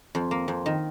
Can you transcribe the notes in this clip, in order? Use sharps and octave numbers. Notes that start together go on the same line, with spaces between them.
F2
A#3
F2
D#3